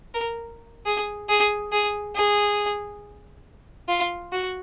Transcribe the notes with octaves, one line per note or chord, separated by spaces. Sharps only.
A#4
G#4
G#4
G#4
G#4
F4
F#4